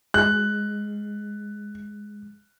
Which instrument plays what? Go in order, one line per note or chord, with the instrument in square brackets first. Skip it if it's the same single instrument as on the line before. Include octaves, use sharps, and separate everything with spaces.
[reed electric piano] G#3 [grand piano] F#6